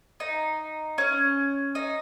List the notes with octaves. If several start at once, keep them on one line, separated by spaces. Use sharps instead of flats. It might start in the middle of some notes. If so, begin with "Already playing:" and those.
D#4
C#4
D#4